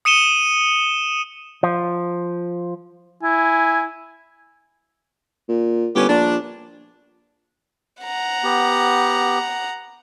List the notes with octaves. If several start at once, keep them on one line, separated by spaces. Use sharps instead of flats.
D#6 C#7 D#7 E7 G7
F3
E4 G#5
A#2
G1 C#4 G4 B4
A#1 D4
F#5 A#5
B3 G4